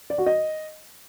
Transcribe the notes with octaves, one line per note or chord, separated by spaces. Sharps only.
D5
F#4
D#5